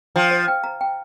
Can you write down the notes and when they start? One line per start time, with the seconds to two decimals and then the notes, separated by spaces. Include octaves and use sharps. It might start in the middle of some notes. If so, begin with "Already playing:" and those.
0.16 F3 G5
0.31 C5
0.48 G5
0.64 A#5
0.81 G5